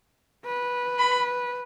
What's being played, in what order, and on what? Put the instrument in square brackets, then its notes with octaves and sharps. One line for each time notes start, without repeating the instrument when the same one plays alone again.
[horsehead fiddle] B4
[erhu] B5